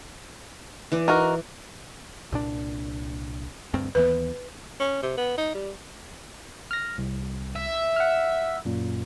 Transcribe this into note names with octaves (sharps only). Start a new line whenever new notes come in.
E3 D5
D#4 F#4 A#4
C2 A#2 D4
D2 G2 C4
D#2 E3 B3 B4
C#4
C3
B3
D#4
G3
F6 A#6
C2
E5
F#5 F6
F#2 A#2